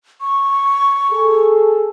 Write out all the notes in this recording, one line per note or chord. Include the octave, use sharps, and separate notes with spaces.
C#6
G#4 A4